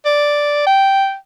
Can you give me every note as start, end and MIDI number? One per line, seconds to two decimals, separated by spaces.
0.05 0.64 74
0.66 1.15 79